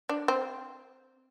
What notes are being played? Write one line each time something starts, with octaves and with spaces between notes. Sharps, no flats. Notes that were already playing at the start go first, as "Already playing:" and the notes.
D4
C4